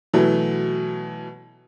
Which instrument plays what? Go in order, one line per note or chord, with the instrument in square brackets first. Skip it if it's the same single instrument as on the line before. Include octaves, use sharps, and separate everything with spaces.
[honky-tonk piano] B2 E3 F#3 A3